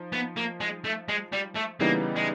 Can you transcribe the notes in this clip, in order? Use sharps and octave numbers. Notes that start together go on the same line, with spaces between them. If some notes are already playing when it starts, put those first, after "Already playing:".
Already playing: F3 D#4
B3
A#3
G#3
A3
G#3
G3
A3
C#3 E3 G3 A#3 B3 D#4
G#3